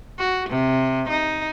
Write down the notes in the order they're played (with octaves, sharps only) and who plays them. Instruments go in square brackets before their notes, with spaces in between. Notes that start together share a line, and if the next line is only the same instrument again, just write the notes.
[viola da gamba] F#4
C3
D#4